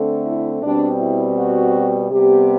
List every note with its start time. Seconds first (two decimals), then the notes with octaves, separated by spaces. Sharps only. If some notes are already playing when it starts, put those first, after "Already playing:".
Already playing: D3 A3 C4
0.26 E4
0.63 B2 G3 C4 D4
1.00 E4
1.37 F#4
2.11 C3 G3 B3 G4